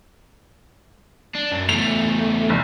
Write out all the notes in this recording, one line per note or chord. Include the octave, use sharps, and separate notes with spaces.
D4
F#2
E2 A3 F7
F1